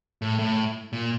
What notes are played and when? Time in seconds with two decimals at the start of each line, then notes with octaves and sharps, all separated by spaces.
0.22 A2
0.39 A2
0.93 A#2